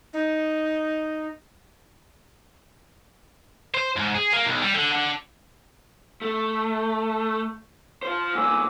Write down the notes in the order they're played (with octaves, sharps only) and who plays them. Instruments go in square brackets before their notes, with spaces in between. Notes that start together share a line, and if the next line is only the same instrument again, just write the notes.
[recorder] D#4
[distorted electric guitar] C5
G#2
G#4
A#3
B1
G3
D3
D3
[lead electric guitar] A3
F4 C5
[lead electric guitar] B1 A#2 [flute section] G#5 D6 E6